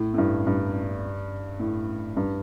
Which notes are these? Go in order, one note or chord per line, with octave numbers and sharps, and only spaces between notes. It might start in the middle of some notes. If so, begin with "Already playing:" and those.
Already playing: A2
A2
G2
G2
A2
G2